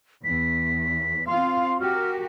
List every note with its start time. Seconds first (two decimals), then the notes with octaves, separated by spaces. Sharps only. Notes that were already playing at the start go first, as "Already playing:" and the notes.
0.24 E2 B6
1.27 C4 F4 F5 C6
1.80 F#4 G4 A#4 F6